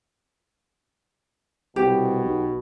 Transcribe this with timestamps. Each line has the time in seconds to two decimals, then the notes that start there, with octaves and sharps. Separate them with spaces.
1.76 C2 B2 G4
2.24 B1